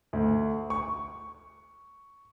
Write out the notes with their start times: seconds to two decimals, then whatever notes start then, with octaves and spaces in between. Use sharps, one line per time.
0.13 D2
0.70 C#6